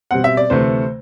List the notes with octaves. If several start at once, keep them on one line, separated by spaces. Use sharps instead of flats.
B2 G3 C4 F#5
E5
D5
D2 C3 E3 A3 C5